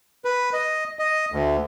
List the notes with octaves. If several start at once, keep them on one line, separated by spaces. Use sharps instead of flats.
B4
D#5
D#5
D2